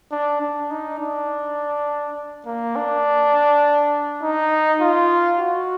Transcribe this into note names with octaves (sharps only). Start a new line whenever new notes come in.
D4
D4
D#4
D4
A#3
D4
D#4
F4
F#4